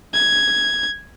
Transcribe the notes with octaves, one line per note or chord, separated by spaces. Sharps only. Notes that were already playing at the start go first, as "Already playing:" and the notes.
G#6